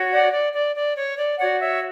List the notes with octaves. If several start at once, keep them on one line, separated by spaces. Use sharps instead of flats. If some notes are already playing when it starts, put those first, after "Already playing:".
Already playing: F#4 C#5
D5 F#5
D5
D5
D5
C#5
D5
F#4 C#5 D5 F#5
C#5 E5